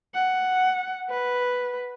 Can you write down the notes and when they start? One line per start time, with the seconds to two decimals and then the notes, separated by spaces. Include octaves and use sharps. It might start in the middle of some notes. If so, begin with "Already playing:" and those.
0.14 F#5
1.10 B4